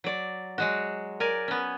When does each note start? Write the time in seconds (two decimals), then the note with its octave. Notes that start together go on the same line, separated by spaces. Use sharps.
0.04 F#3 D5
0.58 F#3 G#3 F#4
1.20 A#4 D5 G#5
1.48 B3 C#4